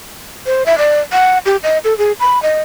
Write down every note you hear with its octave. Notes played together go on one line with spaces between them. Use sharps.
C5
E5
D5
F#5
G4
D#5
A4
G#4
B5
D#5